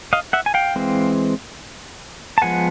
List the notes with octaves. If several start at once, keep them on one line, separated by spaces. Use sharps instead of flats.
D#5 F5
E5 F#5
G#5
F5 G5
E3 G#3 C4
A5
F3 G#3 B3 F#5 G#5